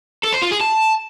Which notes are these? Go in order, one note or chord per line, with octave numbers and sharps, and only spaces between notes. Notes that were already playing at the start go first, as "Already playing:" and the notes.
A4
C5
F4
G#4
A5